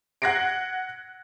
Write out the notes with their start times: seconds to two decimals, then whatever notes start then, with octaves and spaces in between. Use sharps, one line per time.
0.22 F#5 F#6 G#6 A#6 C7 D7